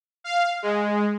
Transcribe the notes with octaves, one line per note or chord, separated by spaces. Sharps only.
F5
G#3